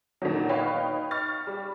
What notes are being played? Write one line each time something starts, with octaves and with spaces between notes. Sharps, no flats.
A#2 D3 D#3 F#3
D#4 B4 C#5 F5 G5
C#6 F6 A6
G3